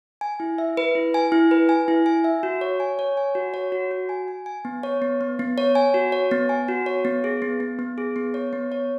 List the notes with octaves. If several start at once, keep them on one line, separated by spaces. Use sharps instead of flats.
G#5
E4
E5
B4
E4
G#5
E4
B4
G#5
E4
G#5
E5
F#4
C#5
G#5
C#5
G#5
F#4
C#5
F#4
F#4
G#5
G#5
G#5
B3
C#5
B3
B3
B3
C#5
G#5
F#4
C#5
B3
G#5
F#4
C#5
B3
G#4
B3
B3
B3
G#4
B3
C#5
B3
C#5